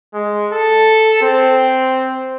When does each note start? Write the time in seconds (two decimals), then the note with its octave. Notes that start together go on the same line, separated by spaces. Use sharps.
0.13 G#3
0.53 A4
1.22 C4